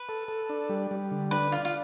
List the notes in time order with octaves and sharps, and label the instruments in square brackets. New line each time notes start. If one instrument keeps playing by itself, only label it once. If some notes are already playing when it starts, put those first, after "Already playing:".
Already playing: [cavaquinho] B4
[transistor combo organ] A4
A4
D4
G3
G3
D3
[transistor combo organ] D4 [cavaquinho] B4
[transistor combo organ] D4 [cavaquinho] F4
[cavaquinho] F4